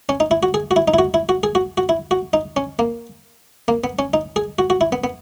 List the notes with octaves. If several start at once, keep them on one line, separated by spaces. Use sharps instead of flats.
C#4
D#4
E4
F#4
G#4
F#4
E4
D#4
E4
F#4
E4
F#4
G#4
F#4
F#4
E4
F#4
D#4
C#4
A#3
A#3
B3
C#4
D#4
G#4
F#4
F#4
E4
B3
B3